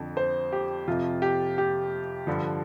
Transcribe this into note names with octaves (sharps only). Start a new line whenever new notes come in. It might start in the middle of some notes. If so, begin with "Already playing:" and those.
Already playing: F2 D3 F3
C5
G4
F2 C3 F3 F4
G4
G4
G2 D3 F3